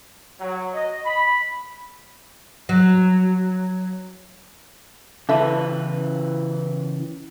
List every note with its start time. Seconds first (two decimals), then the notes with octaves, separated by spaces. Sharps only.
0.40 F#3
0.73 D#5
1.05 B5
2.69 F#3
5.29 C#3 E3 A4 B4 E5